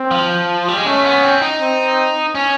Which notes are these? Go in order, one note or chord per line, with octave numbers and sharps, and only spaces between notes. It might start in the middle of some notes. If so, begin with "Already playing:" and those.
Already playing: C4
F3
G3
G#3
A3 C#4
B3
C4
D#4
C4
C#4